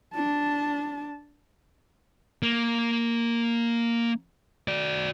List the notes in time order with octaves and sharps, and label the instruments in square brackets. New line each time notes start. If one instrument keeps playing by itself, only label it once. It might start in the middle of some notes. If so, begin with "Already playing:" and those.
[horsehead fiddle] D4 A5
[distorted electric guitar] A#3
F#4 D5